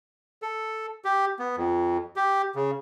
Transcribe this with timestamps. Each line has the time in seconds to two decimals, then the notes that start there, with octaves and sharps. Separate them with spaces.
0.42 A4
1.05 G4
1.39 B3
1.57 F2
2.16 G4
2.55 C#3